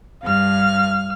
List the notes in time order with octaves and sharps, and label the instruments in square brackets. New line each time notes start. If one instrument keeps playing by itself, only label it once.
[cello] G2 [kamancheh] F5 F6